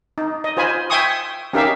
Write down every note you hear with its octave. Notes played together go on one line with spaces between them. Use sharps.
D#4
D#5
F4 C5 G#5 B5
E5 G5 G#5 C6 C#6 D#6
C#4 D#4 G4 A#4 E5 F5